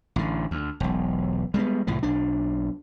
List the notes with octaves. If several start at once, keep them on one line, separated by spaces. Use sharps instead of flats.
A1 D3
D2
E1 B1
G3 G#3 A#3 B3
C2 A2 E3 F3
B1 D4